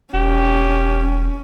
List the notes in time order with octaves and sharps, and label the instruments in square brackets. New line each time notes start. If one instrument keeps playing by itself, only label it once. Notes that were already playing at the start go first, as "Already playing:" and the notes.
[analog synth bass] E1 [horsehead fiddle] C#4 [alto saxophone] G4